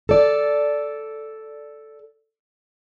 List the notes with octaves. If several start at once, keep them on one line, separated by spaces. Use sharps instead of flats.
A4 D5